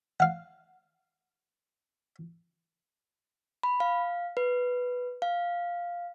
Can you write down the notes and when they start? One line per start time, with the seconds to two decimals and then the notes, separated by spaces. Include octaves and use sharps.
0.20 F5 F#5
3.63 B5
3.80 F5
4.37 B4
5.22 F5